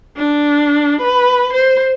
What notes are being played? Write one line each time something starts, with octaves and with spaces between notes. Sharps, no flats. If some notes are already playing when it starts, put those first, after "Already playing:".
D4
B4
C5